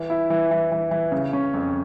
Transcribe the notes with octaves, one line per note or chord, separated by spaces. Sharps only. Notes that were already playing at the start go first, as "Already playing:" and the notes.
Already playing: E3
E4
E3
E3
E3
E3
C#3
C#4
F2